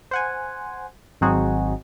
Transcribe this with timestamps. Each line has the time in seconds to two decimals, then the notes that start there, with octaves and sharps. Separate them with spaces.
0.11 C5 F#5 G#5
1.21 G#1 F#3 C4 D#4 F#4 G#4